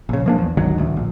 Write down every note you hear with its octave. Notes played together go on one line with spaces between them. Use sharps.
A#1 C#3
F3 A#3 D4
E2
G#1 D2 D#3 F#3
A1 D2
A#1